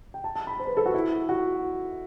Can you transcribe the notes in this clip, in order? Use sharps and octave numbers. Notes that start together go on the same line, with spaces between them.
G5
A5
A5
B5
C5
B4
A4
F#4
E4
F#4